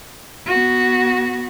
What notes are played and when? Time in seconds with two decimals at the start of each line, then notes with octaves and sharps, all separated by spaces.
0.46 B3 F#4